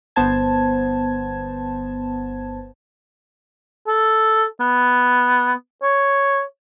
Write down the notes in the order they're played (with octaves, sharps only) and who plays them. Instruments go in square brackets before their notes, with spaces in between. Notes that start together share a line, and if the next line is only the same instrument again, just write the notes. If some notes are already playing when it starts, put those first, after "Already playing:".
[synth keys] G1 B3 C5 A5 G#6
[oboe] A4
B3
C#5